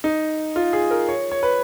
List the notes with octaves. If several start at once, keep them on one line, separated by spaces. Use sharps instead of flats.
D#4
F4
G#4
A#4
C#5
C#5
B4